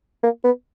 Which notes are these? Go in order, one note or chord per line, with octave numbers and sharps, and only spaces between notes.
A#3
B3